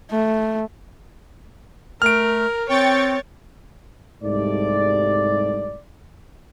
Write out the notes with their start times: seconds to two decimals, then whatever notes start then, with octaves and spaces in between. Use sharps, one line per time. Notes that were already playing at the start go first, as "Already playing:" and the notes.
0.11 A3
2.02 A3 A#4 F6 D7
2.69 C4 C#5 G5 C#6 A6
4.23 C2 G#2 G3 A3 D5